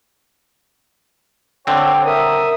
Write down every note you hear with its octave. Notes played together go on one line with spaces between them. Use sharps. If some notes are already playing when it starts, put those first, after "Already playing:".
D3 C4 C#5 G5
A#4 E5 D#6